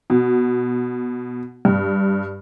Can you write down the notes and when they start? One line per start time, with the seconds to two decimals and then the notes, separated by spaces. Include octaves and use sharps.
0.10 B2
1.65 G2